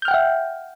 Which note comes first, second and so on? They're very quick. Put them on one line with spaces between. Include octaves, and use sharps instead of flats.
G6 F6 G5 F#5 E5